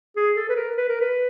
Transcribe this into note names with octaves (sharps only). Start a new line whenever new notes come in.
G#4
A4
B4
A#4
B4
A#4
B4